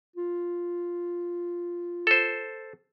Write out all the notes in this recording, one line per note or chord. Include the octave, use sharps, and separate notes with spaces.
F4
A4 C5